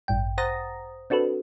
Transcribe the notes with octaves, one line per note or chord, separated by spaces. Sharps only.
A1 G2 G5
C5 F#5 A#5 D#6 A6 A#6
C4 D4 F#4 A4 B4